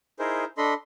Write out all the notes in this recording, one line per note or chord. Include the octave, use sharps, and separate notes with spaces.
D#4 E4 G#4 A#4 C5
D4 A4 D#5 B5 C6